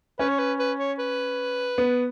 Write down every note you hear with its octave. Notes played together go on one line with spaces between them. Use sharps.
C#4 B4
C#5
B4
B4
C#5
B4
B3